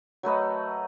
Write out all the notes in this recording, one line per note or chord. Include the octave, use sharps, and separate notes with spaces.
F#3 A3 B4 D#5